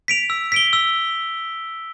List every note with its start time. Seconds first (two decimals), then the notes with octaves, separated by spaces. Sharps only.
0.08 B6 D7 F7
0.30 E6
0.52 B6 D7 G7
0.73 E6